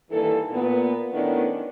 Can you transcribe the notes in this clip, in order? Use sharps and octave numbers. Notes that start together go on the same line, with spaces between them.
G2 D#3 E3 A#3 A4
A#2 B3
D#3 A3 B3 C#4 D4 E4